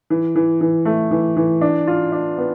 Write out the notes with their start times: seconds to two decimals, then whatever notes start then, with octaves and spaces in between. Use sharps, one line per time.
0.10 E3
0.36 E3
0.61 E3
0.85 A3
1.11 E3
1.37 E3
1.61 D4
1.88 F4
2.12 D4
2.38 B3